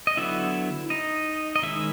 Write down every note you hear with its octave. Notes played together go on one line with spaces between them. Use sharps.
D#5
D3 F#3 B3 E4 E5
D#4 D#5
D#5
D#3 G#3 C#4 E4 E5